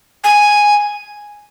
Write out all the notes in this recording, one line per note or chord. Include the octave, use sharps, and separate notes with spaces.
G#5